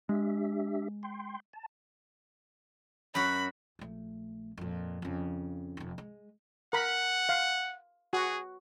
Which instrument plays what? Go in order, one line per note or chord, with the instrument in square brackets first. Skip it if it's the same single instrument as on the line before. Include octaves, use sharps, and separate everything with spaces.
[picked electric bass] G#3 [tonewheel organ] D4 G4 E5
[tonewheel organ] G5 C6
A5
[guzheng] F#2 F#4 [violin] B5
[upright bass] A#1 A3
F2 A#2
F2 C#3
F1 F2
G#3
[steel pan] A#4 B5 [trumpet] F#5
[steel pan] F5
[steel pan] F#4 [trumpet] G#4